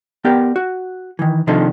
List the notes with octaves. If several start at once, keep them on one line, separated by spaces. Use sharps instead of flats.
B3 G4 A#4 D5 G5
F#4
D#3 E3
C3 D#3 F3 D4 A4 D#5